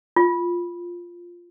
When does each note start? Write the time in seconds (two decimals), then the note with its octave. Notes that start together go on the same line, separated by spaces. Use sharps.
0.16 F4